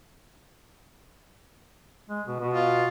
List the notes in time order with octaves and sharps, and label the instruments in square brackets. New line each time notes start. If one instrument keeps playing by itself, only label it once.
[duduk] G#3
B2
B2
[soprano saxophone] F4